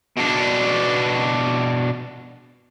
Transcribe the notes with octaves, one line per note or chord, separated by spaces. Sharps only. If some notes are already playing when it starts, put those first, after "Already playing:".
B2 D4